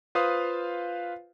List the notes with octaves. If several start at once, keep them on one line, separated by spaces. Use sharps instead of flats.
F4 B4 C5 F5 D#6